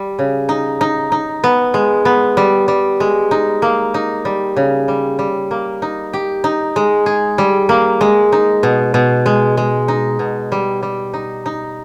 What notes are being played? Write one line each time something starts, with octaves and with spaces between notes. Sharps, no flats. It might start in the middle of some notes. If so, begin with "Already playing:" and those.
Already playing: G3
C#3
D#4
D#4
D#4
B3
G#3
B3
G3
G3
G#3
D#4
A#3
D#4
G3
C#3
G3
G3
A#3
D#4
G4
D#4
G#3
G#4
G3
A#3
G#3
D#4
B2
B2
G#3
G#3
D#4
B2
G3
G3
D#4
D#4